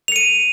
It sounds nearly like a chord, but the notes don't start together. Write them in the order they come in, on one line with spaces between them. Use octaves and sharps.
F7 C#7 D#7